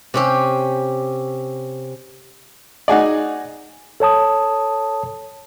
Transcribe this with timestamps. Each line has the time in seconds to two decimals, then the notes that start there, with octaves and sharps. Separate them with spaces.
0.14 C3 C#4 G4
2.88 D#4 F#4 G#4 D5
4.00 A4 C#5 A5 D#6